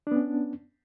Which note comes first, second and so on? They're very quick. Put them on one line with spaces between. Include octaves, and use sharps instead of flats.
D4 B3 C#4